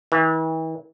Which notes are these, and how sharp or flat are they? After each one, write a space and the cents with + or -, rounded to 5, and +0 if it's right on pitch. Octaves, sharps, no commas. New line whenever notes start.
E3 -40